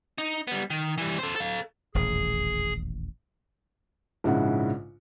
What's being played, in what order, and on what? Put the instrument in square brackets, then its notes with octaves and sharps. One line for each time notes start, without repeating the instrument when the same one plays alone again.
[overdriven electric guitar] D#4
G3 B3
D#3
E3 G3
A4 C5
A4 F5
[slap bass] D#1 A1 E2 [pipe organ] G#4
[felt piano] A#1 G#2 C#3 G#3 E4 F#5